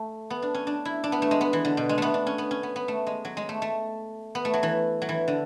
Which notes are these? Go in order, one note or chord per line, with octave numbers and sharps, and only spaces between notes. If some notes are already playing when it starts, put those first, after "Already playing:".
Already playing: A3
B3
D4
C#4
D4
E4
D4
B3
A3
G#3
B3
E3
D3
B2
G#3
A3 B3
D4
C#4
B3
C#4
B3
B3
A3
G#3
F#3
G#3
A3
A3
B3
A3
F#3
E3
F#3
E3
D3